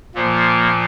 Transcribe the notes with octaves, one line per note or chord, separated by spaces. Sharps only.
A#2 F3 A#3